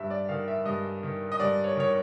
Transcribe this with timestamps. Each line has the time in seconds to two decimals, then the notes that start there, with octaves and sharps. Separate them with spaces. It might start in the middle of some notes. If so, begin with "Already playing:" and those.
Already playing: G2 E5
0.10 D5
0.29 D#3 F5
0.48 E5
0.65 G2 D#5
1.03 D#3
1.32 D#5
1.40 G2 D5
1.64 C#5
1.76 D#3 C#5